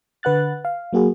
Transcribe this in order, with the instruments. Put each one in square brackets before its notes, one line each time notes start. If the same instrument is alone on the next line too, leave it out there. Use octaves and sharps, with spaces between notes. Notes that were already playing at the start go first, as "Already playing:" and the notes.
[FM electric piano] D3 B4 F#5 F#6 A6
F5
F#3 A#3 F#4 G#4